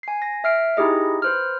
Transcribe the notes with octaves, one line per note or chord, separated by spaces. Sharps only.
G#5 C7
A#6
E5 F6 C7 D7
D#4 E4 G4 G#4 D#5
B4 C5 F6